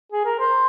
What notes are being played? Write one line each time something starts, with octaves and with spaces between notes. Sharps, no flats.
G#4
A#4
C5